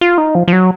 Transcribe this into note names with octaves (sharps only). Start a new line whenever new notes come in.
F4
D#4
F3
F3
F#3